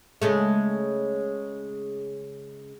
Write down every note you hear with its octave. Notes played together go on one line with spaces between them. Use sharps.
C#3 G#3 A3